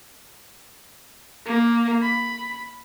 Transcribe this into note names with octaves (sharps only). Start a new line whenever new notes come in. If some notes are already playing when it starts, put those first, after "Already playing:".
A#3
B5